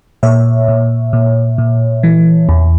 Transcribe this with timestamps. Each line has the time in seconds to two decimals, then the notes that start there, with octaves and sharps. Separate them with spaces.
0.23 A#2 C#5 E5
0.68 A#2
1.13 A#2
1.58 A#2
2.03 E3
2.49 E2